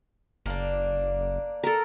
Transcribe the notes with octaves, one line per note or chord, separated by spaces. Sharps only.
F#1 A#3 D4
A4 A#4